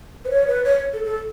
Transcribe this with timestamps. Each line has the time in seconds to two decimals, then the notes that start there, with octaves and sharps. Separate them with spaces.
0.25 B4
0.30 C#5
0.47 B4
0.65 C#5
0.93 A4
1.05 A4